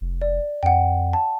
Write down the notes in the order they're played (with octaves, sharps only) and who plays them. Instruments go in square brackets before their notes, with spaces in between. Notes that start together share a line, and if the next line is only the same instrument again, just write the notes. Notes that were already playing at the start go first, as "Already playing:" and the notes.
[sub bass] F1
[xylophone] D5
[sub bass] F2 [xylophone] F#5 G5
[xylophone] A5